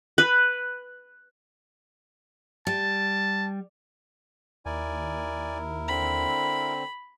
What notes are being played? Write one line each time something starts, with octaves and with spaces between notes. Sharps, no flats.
B4
G3 A5
D#2 E4 A#4 D5 G#5
D3 C4 B5